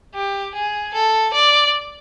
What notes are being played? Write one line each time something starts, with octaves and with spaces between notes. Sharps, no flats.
G4
G#4
A4
D5